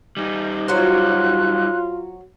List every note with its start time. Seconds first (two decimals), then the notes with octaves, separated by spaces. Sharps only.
0.17 G3 D#4
0.68 F#3 F4 F#4 C5 F#6